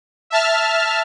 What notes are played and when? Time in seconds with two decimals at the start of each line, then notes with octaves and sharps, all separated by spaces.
0.30 E5 A5 F6